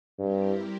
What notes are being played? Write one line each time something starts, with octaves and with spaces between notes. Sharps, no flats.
G2 G3 C4 E4 G4 A#4